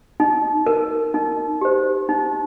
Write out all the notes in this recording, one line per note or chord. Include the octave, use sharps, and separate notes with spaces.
D#4
A#4
D#4
G4 C5
D#4